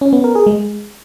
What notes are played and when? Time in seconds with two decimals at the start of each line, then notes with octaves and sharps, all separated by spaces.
0.01 C#4
0.13 B3
0.24 A#4
0.35 G#4
0.47 G#3